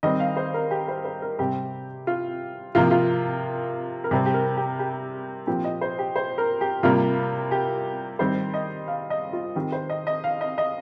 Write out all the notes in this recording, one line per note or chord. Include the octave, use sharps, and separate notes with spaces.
D#3 G3 C4 D#5
F5
C5
A#4
G4
C5
C5
A#4
C3 G3 C4 G4
F4
C3 F3 A#3 F4
F4
A#4
C3 G3 C4 G4
G4
A#4
G4
G4
A#2 F3 C4 G4
D#5
C5
G4
C5
A#4
G4
C3 G3 A#3 F4
G4
D#3 G3 C4 C5
D#5
F5
D#5
F4
D#3 C4 G4
C5
D#5
D#5
F5
D#5
D#5